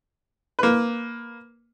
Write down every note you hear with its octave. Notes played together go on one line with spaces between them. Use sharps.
A#3 B4